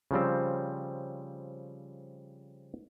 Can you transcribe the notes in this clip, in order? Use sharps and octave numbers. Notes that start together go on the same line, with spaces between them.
C#3 F3 G3 C4